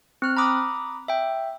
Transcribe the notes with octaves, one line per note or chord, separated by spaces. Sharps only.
C4 F6 F#6
A#5 B5 D6 D#6
E5 G5